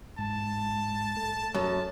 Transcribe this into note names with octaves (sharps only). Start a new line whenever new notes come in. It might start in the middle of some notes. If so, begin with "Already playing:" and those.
G#2 A5
A3
F#2 A5